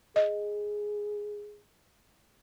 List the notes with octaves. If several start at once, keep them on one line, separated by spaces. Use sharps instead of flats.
G#4 D#5